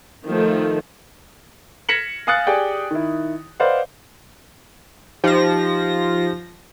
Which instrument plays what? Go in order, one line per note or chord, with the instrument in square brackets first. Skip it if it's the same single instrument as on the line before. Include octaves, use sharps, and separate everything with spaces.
[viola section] D#3 F3 A3
[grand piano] G#6 A#6 B6 C#7 E7 F#7
F5 G#5 D#6 F#6 A6 C#7
G4 G#4 D5 G5
D#3 E4
B4 C5 D5 D#5 F5 F#5
[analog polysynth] F3 A#6 [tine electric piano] D#4 G4 C5